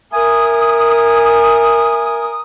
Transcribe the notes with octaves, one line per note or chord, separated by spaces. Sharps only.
A#4 E5 G#5 D#6